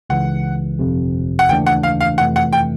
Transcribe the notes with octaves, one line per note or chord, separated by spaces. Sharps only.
C#2 C#3 E3 F#5
G1 F2 C3
F#5
D#2 C#3 E3 A3 D4 G5
F#5
F5
F5
F2 C3 E3 A3 F#5
F#5
G5